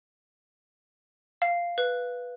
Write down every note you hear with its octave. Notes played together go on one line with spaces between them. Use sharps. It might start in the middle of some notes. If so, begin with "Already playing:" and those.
F5
B4